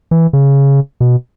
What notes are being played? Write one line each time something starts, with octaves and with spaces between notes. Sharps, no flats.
E3
C#3
B2